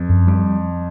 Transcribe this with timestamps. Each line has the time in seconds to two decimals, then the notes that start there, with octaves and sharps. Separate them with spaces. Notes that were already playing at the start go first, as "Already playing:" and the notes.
Already playing: F2
0.09 F#2
0.28 G3